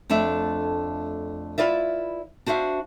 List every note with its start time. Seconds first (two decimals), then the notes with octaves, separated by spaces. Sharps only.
0.09 F2 A3 D4 E5
1.58 E4 F4 B4 D5 E5
2.46 D4 F#4 C5 E5 F5